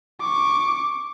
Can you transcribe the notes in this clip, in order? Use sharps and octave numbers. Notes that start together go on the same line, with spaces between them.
C#6 D6